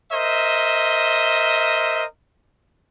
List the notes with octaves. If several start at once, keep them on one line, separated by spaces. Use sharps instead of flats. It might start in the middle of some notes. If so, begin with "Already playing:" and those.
A#4 C5 D#5 E5